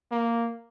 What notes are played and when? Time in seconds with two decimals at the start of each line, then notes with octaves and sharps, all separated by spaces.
0.11 A#3